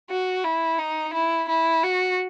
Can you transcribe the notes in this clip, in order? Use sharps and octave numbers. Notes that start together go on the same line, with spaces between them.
F#4
E4
D#4
E4
E4
F#4